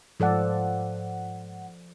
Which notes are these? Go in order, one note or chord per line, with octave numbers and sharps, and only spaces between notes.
G#2 F3 A4 D5 F#5